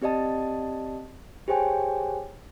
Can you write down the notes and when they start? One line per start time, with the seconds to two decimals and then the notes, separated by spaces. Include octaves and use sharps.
0.02 C4 G4 D5 D#5 A5
1.48 G4 G#4 C5 C#5 G5 G#5